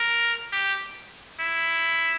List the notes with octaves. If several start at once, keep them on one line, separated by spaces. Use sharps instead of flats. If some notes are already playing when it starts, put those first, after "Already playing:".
Already playing: A#4
G4
E4